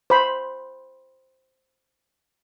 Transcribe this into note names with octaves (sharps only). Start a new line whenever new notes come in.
C5 B5